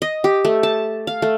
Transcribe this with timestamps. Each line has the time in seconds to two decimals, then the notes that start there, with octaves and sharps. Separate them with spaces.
0.02 D#5
0.24 G4
0.45 A3
0.63 A5
1.07 F5
1.22 A3